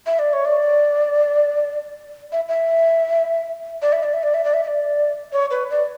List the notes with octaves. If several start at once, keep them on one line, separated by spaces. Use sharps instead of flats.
E5
D5
C#5
D5
E5
E5
D5
E5
D5
E5
D5
E5
D5
E5
E5
D5
C#5
B4
D5